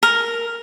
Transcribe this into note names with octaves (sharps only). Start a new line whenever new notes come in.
A#4